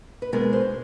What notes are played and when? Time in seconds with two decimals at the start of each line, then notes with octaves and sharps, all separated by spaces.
0.22 B4
0.32 B2 G#3 B3 D4 A#4
0.53 C5